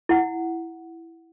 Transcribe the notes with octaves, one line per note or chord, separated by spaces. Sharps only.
E4 F#5